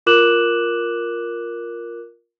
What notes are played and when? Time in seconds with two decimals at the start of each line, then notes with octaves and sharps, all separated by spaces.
0.06 F4 A#4 D6 F#6 E7 F#7